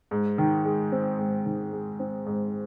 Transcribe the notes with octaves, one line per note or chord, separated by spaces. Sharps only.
G#2
D#3
G#3
C4
G#2
D#3
G#3
C4
G#2